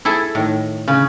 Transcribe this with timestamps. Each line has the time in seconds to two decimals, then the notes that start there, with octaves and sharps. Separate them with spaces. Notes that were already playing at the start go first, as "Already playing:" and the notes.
0.05 E4 G#4 A4
0.35 A2 D#3
0.88 C#3